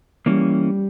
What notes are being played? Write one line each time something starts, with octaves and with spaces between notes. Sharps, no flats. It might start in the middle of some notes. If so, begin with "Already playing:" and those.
E3 G3 A#3 C#4